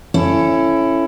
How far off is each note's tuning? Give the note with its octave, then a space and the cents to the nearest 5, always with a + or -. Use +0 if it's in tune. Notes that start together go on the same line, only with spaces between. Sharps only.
C#4 -10 E4 +15 A4 +0